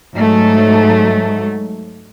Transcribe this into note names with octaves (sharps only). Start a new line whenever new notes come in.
G#2 F#3 A3